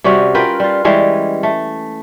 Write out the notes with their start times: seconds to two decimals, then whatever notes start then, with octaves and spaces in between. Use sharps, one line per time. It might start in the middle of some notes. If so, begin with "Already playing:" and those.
0.04 C3 G3 C#4 F#4
0.35 F4 A#4 B4 G5
0.60 G3 F4
0.85 E3 G3 G#3 C#4
1.43 A3